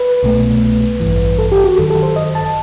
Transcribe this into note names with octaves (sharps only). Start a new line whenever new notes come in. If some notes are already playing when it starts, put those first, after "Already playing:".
Already playing: B4
C2 B2 A3
A1 G2 E3
A4
G4
F#4
G1 F#2 D#3 A4
A4
C5
D#5
A5